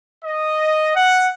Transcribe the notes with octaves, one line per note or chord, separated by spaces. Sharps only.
D#5
F#5